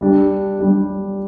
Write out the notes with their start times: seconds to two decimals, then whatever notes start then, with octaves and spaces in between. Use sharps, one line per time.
0.01 G3 D4 G4
0.59 G3 D4 G4